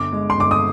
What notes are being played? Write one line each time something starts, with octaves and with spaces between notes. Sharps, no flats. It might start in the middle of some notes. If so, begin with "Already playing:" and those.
Already playing: G1 D6
G#3
C6
G1 D6
D#6